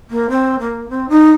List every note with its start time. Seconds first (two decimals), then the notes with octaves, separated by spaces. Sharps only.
0.10 A#3
0.29 C4
0.59 A#3
0.89 C4
1.09 D#4